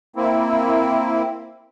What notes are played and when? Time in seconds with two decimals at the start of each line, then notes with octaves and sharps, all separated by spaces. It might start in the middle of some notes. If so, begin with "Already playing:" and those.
0.16 A#3 C4 E4